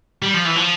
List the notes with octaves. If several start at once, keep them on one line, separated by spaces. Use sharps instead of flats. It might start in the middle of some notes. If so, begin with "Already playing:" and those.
G3
F3
E3
F3